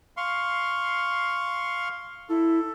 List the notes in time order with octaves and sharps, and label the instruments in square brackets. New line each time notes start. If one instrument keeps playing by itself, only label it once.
[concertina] F5 C6 C#6
[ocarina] E4 [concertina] A4